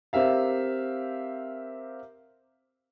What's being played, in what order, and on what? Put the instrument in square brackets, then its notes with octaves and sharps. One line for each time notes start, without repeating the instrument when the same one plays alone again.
[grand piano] C4 G4 A#4 E5 F5